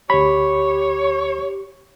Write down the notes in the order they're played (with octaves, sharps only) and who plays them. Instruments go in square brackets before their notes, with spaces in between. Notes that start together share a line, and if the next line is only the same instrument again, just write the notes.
[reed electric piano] D2 B5 [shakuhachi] G4 [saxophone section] C#5